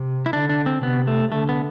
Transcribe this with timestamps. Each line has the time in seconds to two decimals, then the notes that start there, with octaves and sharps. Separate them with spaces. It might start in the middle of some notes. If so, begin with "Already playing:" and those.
Already playing: C3
0.26 E4
0.33 D3 D4
0.49 D4
0.66 C4
0.83 C3 B3
1.07 A3
1.32 D3 A3
1.49 B3